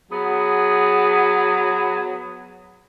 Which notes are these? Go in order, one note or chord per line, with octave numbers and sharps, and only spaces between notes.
F#3 B3 G#4